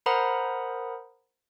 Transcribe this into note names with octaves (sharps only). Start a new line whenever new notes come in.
A#4 C5 F#5 A#5 B5 D#6